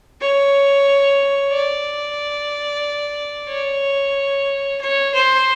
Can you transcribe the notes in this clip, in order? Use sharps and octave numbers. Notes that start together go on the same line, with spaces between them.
C#5
D5
C#5
C#5
C5